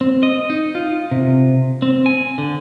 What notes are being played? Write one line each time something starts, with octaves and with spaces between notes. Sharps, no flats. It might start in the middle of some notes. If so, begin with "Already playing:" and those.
C4
D#5
D#4
F4
C3
C4
G#5
D3